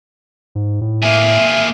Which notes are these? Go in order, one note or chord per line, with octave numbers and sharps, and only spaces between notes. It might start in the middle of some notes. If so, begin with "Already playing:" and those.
G#2
A2
A#3 G#4 E5